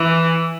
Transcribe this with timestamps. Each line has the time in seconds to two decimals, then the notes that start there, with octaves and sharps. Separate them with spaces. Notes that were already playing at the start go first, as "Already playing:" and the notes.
Already playing: E3